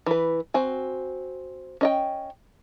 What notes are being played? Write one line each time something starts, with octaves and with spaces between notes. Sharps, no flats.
E3 B4
C4 F#4 G#5
C#4 D#5 G5